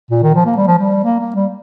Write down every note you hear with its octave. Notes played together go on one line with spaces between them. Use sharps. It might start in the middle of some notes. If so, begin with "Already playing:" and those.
A#2
D#3
F3
A#3
G3
F3
G3
A#3
A#3
G3